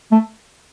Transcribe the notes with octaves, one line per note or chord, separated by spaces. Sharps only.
A3